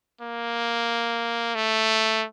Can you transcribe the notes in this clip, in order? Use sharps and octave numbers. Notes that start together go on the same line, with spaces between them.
A#3
A3